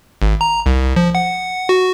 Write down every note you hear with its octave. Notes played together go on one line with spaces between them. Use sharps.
G#1
A#5
C2
F3
F#5
F#4